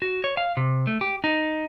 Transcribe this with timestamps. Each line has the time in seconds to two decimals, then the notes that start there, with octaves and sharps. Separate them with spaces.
0.02 F#4
0.24 C#5
0.37 F5
0.57 C3
0.87 A3
1.01 G4
1.24 D#4